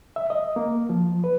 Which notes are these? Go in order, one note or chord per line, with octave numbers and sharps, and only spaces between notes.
E5
D#5
A#3
F3
B4